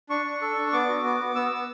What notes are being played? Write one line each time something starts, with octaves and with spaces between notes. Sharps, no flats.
D4 C#6
D4
A4
D4
B3 D6
F#4
B3 D6
B3
B3 E6
B3